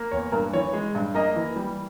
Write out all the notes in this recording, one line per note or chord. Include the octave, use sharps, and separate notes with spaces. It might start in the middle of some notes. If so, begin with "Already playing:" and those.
Already playing: A#3
E2 C#5
G2 A#4
E3 C#5
G#3
G2
A#3 D#5
E3
G3